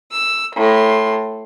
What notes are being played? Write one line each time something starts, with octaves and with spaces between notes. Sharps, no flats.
E6
A2 C6